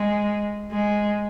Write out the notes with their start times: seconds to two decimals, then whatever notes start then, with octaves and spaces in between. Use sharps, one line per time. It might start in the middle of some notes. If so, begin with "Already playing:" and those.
Already playing: G#3
0.71 G#3